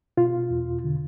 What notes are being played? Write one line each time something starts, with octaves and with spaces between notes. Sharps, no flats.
B2 F4
E2
D3